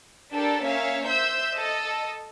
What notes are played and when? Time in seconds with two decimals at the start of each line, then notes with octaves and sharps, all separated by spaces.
0.32 D4 G4 A4 A#4 D5
0.64 A#3 C#4 C#5 E5 F5
1.07 C5 E5 E6 G6
1.56 A4 D#5